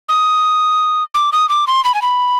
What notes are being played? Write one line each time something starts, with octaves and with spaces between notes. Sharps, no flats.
D#6
D6
D#6
D6
C6
B5
G#5
B5